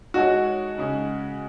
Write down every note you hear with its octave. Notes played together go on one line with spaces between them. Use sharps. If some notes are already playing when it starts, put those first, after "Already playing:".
G#3 D#4 F#4 A4 C#5
C#3 G#3 C#4